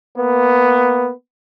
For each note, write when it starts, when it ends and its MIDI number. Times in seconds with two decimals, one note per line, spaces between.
0.16 1.11 58
0.16 1.11 59